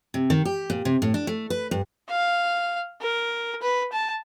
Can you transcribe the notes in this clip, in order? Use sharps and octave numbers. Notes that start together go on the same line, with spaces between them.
C3
D#3
G4
A#2
C3
A2
D4
A3
B4
G2
F5
A#4
B4
A5